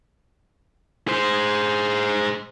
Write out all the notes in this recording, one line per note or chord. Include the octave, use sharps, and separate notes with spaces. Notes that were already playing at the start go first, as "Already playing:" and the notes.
G#4 C5